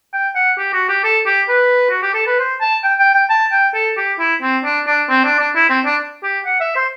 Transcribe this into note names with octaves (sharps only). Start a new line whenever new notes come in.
G5
F#5
G4
F#4
G4
A4
G4
B4
F#4
G4
A4
B4
C5
A5
G5
G5
G5
A5
G5
A4
G4
E4
C4
D4
D4
C4
D4
D4
E4
C4
D4
G4
F#5
E5
C5